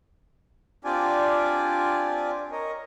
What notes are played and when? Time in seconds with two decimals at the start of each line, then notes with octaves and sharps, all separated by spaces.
0.85 C4 D4 F4 G4 D5 G#5
2.52 A#4 C#5 D#5